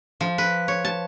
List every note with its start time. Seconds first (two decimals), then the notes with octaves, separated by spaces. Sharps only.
0.21 F3
0.38 B4
0.68 C#5
0.85 A5